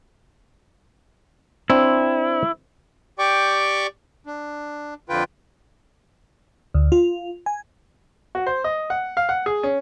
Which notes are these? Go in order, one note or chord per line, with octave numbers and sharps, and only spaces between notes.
C4 D4 E4
G4 D5 G5 C#6 D6
D4
F2 D3 F4 B4 G5
D2
F4
G#5
F#4
C5
D#5
F#5
F5
F#5
G#4
C#4